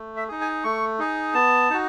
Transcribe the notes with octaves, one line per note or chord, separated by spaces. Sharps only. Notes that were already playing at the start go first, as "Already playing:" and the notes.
Already playing: A3
E5
D#4 G#4
G#5
A3 C#6
D#4 G#4
B3 A5
D#4 F#4